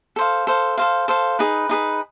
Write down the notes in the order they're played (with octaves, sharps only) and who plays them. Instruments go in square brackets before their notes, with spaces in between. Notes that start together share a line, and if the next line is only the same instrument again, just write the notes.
[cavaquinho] A4 C5 F5
A4 C5 F5
A4 C5 F5
A4 C5 F5
D#4 G#4 B4
D#4 G#4 B4